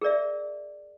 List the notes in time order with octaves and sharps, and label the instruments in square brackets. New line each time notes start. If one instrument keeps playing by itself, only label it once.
[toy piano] G#4 A#4 D5 E5